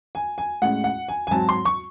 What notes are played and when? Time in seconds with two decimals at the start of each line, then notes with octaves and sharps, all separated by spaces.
0.15 G#5
0.38 G#5
0.62 A2 G#3 C#4 F#5
0.84 F#5
1.08 G#5
1.27 G#5
1.31 G#2 F#3 C4 A5
1.49 C6
1.65 C#6